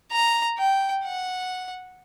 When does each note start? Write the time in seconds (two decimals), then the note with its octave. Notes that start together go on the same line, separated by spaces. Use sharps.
0.11 A#5
0.58 G5
1.05 F#5